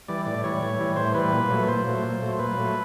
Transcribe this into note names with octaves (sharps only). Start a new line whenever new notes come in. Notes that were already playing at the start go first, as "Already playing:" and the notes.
E3 G3 D5
A2 D5
E3 G3 C#5
A2
E3 G3
A2 C5
E3 G3 B4
A#2
F#3 A3
A#2 C5
F#3 A3
A#2
F#3 A3
A#2 B4
F#3 A3